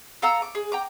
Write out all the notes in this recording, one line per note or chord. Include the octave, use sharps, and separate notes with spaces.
A4 F5 A#5 E6
D6
G#4
G5 A#5 D6